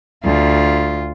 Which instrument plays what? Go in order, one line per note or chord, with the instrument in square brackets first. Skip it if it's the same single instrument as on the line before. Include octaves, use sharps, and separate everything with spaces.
[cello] D2 F4